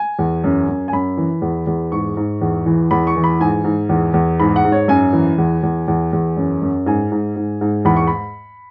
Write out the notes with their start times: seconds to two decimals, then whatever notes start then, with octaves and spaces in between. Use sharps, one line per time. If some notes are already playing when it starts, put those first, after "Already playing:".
Already playing: G#5
0.19 E2
0.44 F#2
0.68 F#2
0.88 G#5
0.92 F#2 B5
1.17 E3
1.42 E2
1.67 E2
1.92 G#2 C#6
2.17 G#2
2.41 E2
2.66 E3
2.91 E2 B5
3.07 C#6
3.16 E3
3.24 B5
3.40 G#2 G#5
3.64 G#2
3.89 E2
4.14 E2
4.40 G#2 B5
4.56 F#5
4.65 G#2
4.72 C#5
4.88 F#2 G#5
5.13 E3
5.38 E2
5.63 E2
5.88 E2
6.13 E2
6.37 F#2
6.62 F#2
6.86 G#2 G#5
7.12 G#2
7.36 G#2
7.61 G#2
7.85 E2 B5
7.96 C#6
8.07 B5